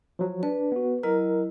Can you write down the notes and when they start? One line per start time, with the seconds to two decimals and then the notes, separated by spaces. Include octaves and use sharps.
0.19 F3 F#3
0.43 D4 B4
0.72 B3 F#4
1.03 F#3 E4 A#4 D#5